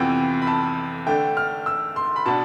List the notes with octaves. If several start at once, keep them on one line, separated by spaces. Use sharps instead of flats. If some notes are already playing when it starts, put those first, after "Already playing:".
Already playing: F2 C3 E3 B3 G5
B5
A5
D3 A3 D4 G5
F6
E6
C6
B5
B2 B3 D4 A5